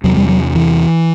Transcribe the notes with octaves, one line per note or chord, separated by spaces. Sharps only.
E2 C3 F#3
G3
F#3
E3